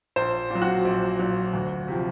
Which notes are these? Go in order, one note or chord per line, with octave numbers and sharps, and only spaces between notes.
A#1 C5
A#2 F#3
F#4
A#1
A#2 F#3
D2
C3 F3